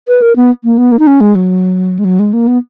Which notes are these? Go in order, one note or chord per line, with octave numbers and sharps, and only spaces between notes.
B4
A#4
B3
A#3
B3
A#3
D#4
C#4
G#3
F#3
G#3
F#3
G#3
A#3
B3